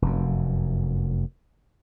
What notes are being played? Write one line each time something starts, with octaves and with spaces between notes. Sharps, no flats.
F1 F#2